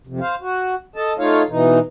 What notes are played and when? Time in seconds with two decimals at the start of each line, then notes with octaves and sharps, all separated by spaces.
0.07 F2 C3
0.20 C5 F5
0.41 F#4
0.96 A4 D#5 A5
1.18 A3 D#4 F4 C#5 F5
1.49 B2 E3 D#4